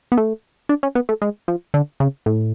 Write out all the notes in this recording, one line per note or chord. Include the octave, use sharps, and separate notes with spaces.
B3
A3
D4
C#4
B3
A3
G#3
F3
D3
C#3
A2